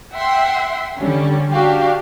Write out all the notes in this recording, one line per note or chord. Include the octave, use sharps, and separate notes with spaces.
E5 F#5 G5 C6
D3 G3 C#4
D4 F#4 G4 F5